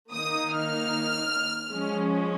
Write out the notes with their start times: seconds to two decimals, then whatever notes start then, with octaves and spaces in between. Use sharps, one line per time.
0.13 D#3 A#3 D#4 D#6
0.52 F6
1.71 F3 G#3 C#4